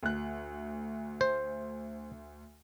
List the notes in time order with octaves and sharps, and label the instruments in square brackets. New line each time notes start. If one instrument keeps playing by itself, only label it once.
[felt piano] D2 F#6
[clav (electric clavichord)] C5